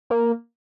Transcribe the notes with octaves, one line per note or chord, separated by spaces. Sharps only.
A#3